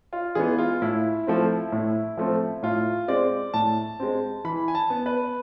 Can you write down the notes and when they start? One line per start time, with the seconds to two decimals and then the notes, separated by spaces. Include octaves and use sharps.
0.13 F4
0.35 E3 G#3 B3 G#4
0.58 F4
0.82 A2 E4
1.27 F3 A3 C4
1.72 A2
2.17 F3 A3 C4
2.63 A2 F4
3.08 G#3 C4 D5
3.54 A2 A5
4.00 G#3 C4
4.44 E3 B5
4.68 G#5
4.75 A5
4.90 B3
5.06 B4